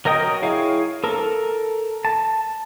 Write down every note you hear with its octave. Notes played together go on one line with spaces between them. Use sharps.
F#3 A#4 D#5 G5 D#6
E4 G#4 C#5 F5
A4 A#4
A5